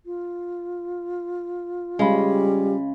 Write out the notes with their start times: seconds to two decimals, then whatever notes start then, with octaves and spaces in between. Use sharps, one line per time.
0.06 F4
1.99 C#3 G3 G#3 B5